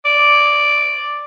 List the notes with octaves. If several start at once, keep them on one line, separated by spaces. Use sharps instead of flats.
D5